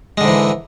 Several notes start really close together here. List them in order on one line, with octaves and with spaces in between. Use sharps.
G#3 D3 G#2 E3